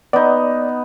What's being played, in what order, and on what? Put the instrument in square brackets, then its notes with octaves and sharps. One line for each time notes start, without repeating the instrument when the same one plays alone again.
[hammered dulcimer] B3 D#4 [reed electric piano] D5